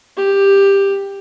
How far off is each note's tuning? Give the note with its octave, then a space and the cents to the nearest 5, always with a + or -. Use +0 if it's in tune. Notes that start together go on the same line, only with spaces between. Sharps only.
G4 +10